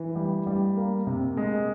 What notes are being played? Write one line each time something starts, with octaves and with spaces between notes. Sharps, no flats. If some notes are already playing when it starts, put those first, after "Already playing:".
Already playing: E3
G3
G3
A#3
C3
G#3